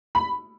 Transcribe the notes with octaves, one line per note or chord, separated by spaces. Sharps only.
B5